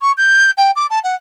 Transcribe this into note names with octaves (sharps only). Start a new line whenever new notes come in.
C#6
G6
G5
D6
A5
F#5